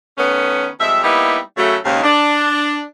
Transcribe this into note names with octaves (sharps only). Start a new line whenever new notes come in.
D#3 A3 B3 C#4
F2 G3 G#3 E5
G3 A#3 B3 D#4 E4 G4
C#3 F#3 A3
D#2 G#2 C#3
D4